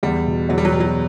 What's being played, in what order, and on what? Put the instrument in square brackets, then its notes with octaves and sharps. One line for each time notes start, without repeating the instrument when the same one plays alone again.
[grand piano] E2 [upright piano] G3
[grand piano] B2
[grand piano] E2 [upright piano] F#3
[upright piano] G3
F#3
[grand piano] B2 [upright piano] G3
[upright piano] F#3